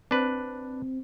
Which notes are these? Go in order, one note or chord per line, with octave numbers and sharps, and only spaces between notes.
C4 D4 B4